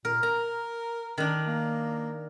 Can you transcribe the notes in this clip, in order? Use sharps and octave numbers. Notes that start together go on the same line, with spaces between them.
A#2 A#4
A#4 A#5
D#3 D4
A#3